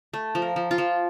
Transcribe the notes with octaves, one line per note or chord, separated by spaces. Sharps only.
A3
F3
A#4
F3
F4
F3